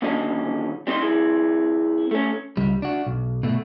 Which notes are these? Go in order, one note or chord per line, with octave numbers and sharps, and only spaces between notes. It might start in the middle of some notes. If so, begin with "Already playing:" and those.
D#2 A#2 D3 F#3 C#4 D#5
G3 C4 D#4 D#5 C6
C4 E4 G#4
A3 C#4
C#2 G3
D4 F#4
B1
B2 A3